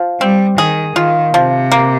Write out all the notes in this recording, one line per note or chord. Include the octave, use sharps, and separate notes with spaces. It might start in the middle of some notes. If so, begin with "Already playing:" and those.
Already playing: F3
G3 C4
D#3 G#4
D#3 F4
C3 F3
A#3